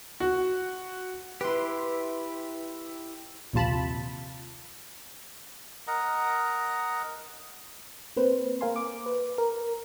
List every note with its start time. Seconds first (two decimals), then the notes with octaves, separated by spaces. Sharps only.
0.20 F#4
1.41 E4 G4 B4 C6
3.53 A#1 D#2 C3 F4 A5 B5
5.87 A#4 D#5 F#5 A#5
8.16 A#3 C4 B4 C5
8.61 A#3 A#4 F5 G#5 C6
8.76 D6
9.06 B4
9.38 A#4